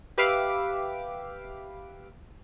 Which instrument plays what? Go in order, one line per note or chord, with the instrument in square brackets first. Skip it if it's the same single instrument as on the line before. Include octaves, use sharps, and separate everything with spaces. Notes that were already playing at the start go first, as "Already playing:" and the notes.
[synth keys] G4 B4 E5 F5 D6